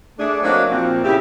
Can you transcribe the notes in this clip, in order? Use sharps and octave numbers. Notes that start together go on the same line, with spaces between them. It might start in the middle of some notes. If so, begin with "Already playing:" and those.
A3 D4 G#4
F#3 A#3 C4 D4 D#4 F#4
A#2 F3 C4
C#3 E4 G4